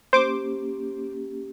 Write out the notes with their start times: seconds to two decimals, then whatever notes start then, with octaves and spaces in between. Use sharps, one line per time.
0.13 A#3 C#4 G4 C5 D6